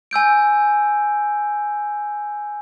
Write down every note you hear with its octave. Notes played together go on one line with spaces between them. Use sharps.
G#5 E6 G6 D7